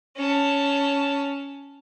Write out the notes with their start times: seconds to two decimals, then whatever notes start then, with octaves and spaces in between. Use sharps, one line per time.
0.17 C#4 A5